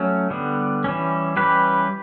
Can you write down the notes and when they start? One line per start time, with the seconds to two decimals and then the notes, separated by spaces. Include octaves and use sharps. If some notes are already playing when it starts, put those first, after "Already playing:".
Already playing: F#3 A3 C#4
0.30 D3 G3 B3
0.84 E3 G3 C#4
1.36 E3 G3 C#4 G4 B4